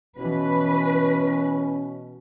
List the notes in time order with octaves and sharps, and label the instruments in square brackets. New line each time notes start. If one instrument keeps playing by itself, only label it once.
[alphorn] B2 [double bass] E3 [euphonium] C#4 [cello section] B4